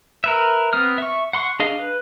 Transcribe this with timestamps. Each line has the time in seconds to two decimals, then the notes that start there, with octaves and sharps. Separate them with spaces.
0.24 A#4 B4 E5
0.73 B3 C4 D#6 F6
0.98 E5 C#6
1.33 F#5 C6 C#6
1.60 D4 G#4 D#5 F5
1.79 B4